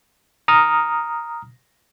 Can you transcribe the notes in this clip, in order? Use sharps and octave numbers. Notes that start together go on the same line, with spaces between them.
A#5 D#6 F6